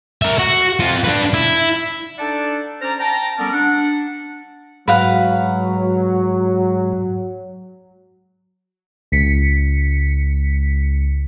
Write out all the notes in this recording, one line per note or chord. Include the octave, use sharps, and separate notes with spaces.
A#4 E5
F#4
C4 F4
D4 B4
E4
D4 D#4 A4 D5 F#5 A5
C#4 C5 D5 A#5
G5 A5 A#5
G3 B3 C#4 A4 A#4 D5
D4 F#5
G#2 F#3 B4 F5 F#5
C#2 B6 C#7